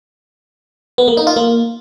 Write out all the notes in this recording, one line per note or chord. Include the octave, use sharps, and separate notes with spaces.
B3
A#3
D#4
F4
A#3